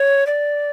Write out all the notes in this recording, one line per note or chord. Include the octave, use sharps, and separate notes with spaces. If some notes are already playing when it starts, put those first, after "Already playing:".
Already playing: C#5
D5